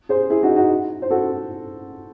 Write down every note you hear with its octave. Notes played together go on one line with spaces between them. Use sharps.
G#4 C5
E4 G#4
D#4 F#4
D#4 F#4
C5
F#4 A4